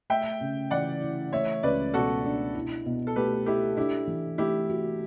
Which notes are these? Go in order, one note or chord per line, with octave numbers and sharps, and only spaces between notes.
A3 E5 G5
C#3
E3 D5 F#5
E4
A3 C#5 E5
C#2 B4 D5
B2 F#4 A4
D4
E4
B2
A4
A3 G4 B4
E4 G4 A4
D4 E4 G4
E3
A3 E4 G4
F#4